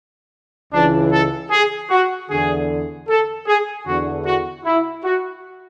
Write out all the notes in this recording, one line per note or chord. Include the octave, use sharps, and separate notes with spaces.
C#2 C#3 E3 D4
A4
G#4
F#4
E2 D3 G#4
A4
G#4
E2 D3 F#4
F#4
E4
F#4